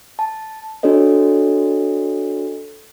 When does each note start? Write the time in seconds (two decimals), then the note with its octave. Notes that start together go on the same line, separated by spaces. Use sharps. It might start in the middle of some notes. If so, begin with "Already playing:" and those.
0.19 A5
0.83 D4 F#4 A4 C#5 D#5